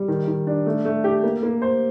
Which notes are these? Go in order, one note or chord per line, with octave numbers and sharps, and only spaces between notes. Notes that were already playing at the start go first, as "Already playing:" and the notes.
Already playing: G3
D#3
D#3
D4
A3
A3
G4
A#3
A#3
C5